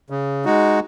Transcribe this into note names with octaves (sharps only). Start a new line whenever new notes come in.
C#3
G#3 D#4 F#4